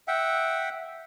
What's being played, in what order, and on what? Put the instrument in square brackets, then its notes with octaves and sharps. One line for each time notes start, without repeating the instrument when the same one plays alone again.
[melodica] E5 F#5 G5